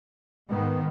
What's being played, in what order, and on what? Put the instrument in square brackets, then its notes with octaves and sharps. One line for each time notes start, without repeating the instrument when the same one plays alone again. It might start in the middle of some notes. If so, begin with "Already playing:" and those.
[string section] G#2 [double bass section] D#3 B3